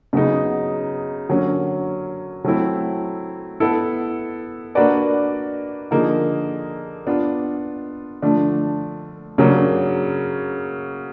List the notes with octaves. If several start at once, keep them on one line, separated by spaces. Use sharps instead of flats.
C#3 F#3 B3 D#4 G#4
D3 F#3 A#3 C#4
F#3 A3 C4 E4
B3 E4 A4
A#3 D4 F#4 B4 D5
D3 F3 A#3 D#4 G#4
B3 D4 F4
D3 F3 A3 D4
C#3 F#3 A#3 D4